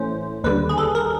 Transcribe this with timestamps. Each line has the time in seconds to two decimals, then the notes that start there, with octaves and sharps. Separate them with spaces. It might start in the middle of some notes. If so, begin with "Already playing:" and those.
Already playing: A2 E3 A3 C#4 C5
0.44 D#2 D3 G3 B4
0.69 G#4
0.78 A4
0.95 A#4